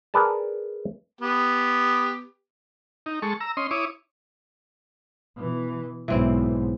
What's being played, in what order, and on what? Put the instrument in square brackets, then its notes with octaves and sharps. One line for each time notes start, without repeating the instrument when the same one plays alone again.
[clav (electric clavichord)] G#4 A#4 B4 D5 A5
[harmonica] B3 G4
[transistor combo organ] D#4
G#3 A4 C#6
A#5 E6
C#4 D#5 C6
E4 C#5 D6 D#6
[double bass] B2 E3
[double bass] B1 G#2 [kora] E3 C4 E4